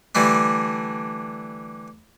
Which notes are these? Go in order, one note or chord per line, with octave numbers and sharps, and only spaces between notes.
D3 E3 G3 A3 D4